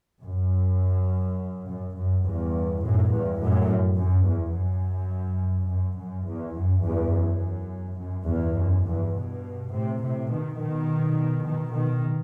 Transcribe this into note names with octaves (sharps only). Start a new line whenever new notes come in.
F#2
F#2
F#2
E2 G2
F#2 A2
E2 G2
F#2 A2
F#2
E2
F#2
F#2
F#2
E2
F#2
E2 G2
F#2
F#2
E2 G2
F#2
E2 G2
G2 B2
A2 C3
A2 C3
B2 D#3
B2 D#3
B2 D#3
B2 D#3